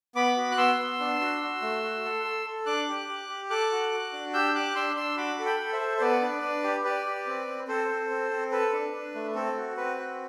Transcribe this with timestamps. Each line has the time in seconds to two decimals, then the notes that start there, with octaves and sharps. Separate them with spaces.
0.15 B3 B5 D6
0.37 F#4
0.51 F#6
0.58 B3 C6 E6
0.79 B3
1.00 D4
1.20 F#4
1.41 F#4
1.62 A3
1.83 F#4
2.05 A4
2.25 A4
2.45 A4
2.66 D4 D6 F#6
2.88 G4
3.09 G4
3.29 G4
3.50 A4 D6 F#6
3.72 F#4
3.92 F#4
4.13 D4
4.34 G4 E6 G6
4.55 G4 D6 F#6
4.75 D4 C6 E6
4.96 D4 C6 E6
5.17 F#4 B5 D6
5.39 A4
5.45 G5 B5
5.59 A4
5.73 C5 E5
5.81 A4
5.97 C5
6.01 B3 B4 D5
6.22 D4
6.42 D4
6.64 G4
6.84 G4 B4 D5
7.06 G4
7.27 C4
7.48 C4
7.68 C4 A4 C5
7.89 C4
8.10 C4
8.31 C4
8.51 A4 B4
8.73 D4
8.93 D4
9.15 A3
9.35 C4 A4
9.57 F#4
9.77 C4 B4
9.98 F#4